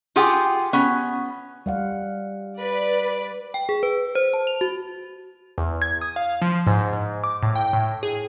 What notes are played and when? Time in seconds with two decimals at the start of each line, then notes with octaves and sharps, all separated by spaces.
0.16 F4 G4 G#4 F#5 G5
0.73 B3 C#4
1.66 G3 F5 F#5
2.59 B4 D5
3.54 G5
3.69 G#4
3.83 B4
4.15 C5
4.33 A5
4.47 F7
4.61 F#4
5.58 E2
5.82 G#6
6.01 D#6
6.16 F5
6.42 F3
6.67 G#2
6.93 G#2
7.24 D6
7.43 A2
7.56 G5
7.73 A2
8.03 G#4